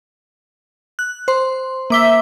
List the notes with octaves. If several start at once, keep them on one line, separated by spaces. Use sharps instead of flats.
F#6
C5 C6
A#3 E5 D6 G7